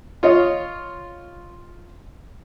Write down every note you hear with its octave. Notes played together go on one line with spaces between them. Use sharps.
F4 C#5 D#5